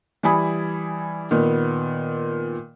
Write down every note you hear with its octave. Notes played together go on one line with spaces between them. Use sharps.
E3 G3 E4 G#5 B5 D#6
A#2 D#3 B3